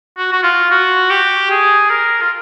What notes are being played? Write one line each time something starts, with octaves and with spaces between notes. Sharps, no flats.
F#4
F#4
F4
F#4
G4
G#4
A#4
F4